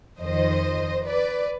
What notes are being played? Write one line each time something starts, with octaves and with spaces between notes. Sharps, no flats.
F2 D#3 C5 D#5
B4 D5